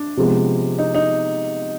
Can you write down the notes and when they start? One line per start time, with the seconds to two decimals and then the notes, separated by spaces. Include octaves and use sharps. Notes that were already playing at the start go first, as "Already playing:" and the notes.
Already playing: D4
0.17 C3 F3 G#3 B3
0.79 D#4
0.95 D#4